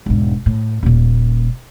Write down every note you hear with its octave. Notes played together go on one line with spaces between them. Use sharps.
E1 G#2
A2
D#1 A#2